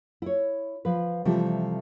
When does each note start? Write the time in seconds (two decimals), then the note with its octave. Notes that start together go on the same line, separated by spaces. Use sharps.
0.22 E4 C#5
0.85 F3 B4
1.25 C3 E3 F3 G3 A3